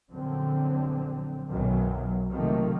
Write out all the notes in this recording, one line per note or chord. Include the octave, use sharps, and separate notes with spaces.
A#1 F#2 D3 C4
B1 F#2 D#3 F#3
C3 D#3 F3 F#3 A3 A#3